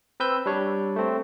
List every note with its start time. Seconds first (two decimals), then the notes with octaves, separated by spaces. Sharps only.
0.20 C4 B4 E6 G6
0.46 G3 D4 C#5
0.96 A3 C4